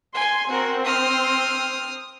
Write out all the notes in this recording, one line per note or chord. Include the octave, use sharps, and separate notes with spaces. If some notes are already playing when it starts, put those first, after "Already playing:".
G#5 C6
C4 F#4 A#4
D#6 F6